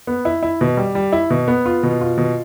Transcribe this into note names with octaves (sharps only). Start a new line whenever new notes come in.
B3
E4
E4
B2
G3
G3
E4
B2
B3
F4
B2
F4
B2